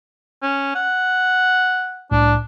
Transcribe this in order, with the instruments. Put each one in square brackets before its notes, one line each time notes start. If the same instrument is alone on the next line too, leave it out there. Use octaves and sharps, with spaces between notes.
[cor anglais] C#4
F#5
[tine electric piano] C2 A2 [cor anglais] D4